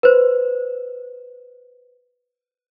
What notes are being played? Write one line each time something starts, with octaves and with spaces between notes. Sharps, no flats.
B4 C5